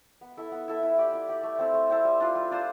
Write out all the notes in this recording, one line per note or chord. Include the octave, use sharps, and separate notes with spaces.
B3
E4 A4 E5
B3
E4 A4 E5
E4
G4 D5
E4
G4 D5
A3
C4 E4 A4
A3
C4 E4 A4
G3
D4 F4 C5
G3
D4 F4 C5